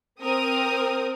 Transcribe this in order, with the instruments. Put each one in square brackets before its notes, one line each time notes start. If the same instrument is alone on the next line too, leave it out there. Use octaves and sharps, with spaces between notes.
[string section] C4 A#4 D#6